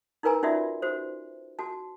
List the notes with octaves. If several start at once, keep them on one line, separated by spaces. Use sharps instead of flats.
D#4 E4 A#4 B4 G#5 A#5
C#4 D#4 F4 F#4 D5 E5
F#4 C5
F#4 A5